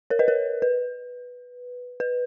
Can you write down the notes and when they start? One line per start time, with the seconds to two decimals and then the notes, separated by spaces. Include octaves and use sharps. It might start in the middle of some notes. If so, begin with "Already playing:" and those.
0.10 A#4 C#5
0.19 B4 D#5
0.28 A#4 C#5
0.62 B4
2.00 B4